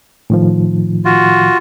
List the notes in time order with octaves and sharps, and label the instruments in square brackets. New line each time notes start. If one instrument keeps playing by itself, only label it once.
[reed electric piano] A2 D#3 F3
[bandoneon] F4 F#4